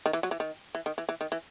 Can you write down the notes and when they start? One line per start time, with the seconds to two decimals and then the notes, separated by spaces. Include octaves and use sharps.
0.06 D#3
0.13 E3
0.23 F#3
0.31 E3
0.40 D#3
0.75 E3
0.86 D#3
0.98 E3
1.09 E3
1.21 D#3
1.32 E3